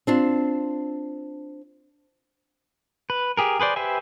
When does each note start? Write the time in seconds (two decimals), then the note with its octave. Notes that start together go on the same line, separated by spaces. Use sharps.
0.07 C4 D4 F4
3.10 B4
3.37 G4 G#4 A#4
3.60 G#4 B4 C5 D5
3.76 G4 B4 C5 E5 G#5